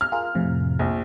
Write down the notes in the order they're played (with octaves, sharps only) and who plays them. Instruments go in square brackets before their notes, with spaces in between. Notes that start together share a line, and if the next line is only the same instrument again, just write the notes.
[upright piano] F6
[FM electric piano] F4 G#4 A#4
F2 A2 C3
[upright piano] A#1